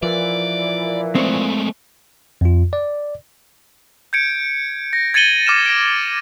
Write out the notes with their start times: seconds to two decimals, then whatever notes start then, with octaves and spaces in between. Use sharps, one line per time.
0.03 A#2 E3 F3 D5
1.15 G#3 A3 C4 C#5
2.41 F2 F4
2.73 D5
4.13 G6 G#6 C#7 D7
4.93 A#6
5.14 G#6 A6 C#7 D#7 F#7 G7
5.47 D6 F6 E7
5.66 A#6 D7